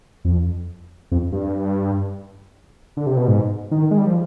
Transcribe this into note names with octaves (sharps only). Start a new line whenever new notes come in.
F2
F2
G2
D3
C3
B2
G#2
D#3
G#3
G3
F3